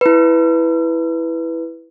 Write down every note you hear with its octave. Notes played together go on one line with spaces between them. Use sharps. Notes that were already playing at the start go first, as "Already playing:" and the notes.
E4 B4